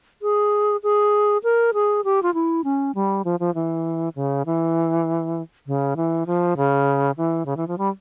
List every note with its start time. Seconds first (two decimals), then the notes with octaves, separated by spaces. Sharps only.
0.22 G#4
0.83 G#4
1.43 A#4
1.74 G#4
2.04 G4
2.23 F4
2.34 E4
2.64 C#4
2.95 G3
3.25 F3
3.40 F3
3.55 E3
4.15 C#3
4.46 E3
5.67 C#3
5.97 E3
6.27 F3
6.57 C#3
7.17 E3
7.46 C#3
7.57 E3
7.68 F3
7.78 G3